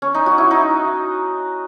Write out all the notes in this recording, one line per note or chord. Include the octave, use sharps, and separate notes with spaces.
C#4
D#4
F#4
E4
D#4